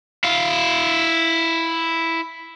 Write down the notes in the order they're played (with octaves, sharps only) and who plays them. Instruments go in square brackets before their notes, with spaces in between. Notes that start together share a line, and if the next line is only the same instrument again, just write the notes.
[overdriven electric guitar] E4 F5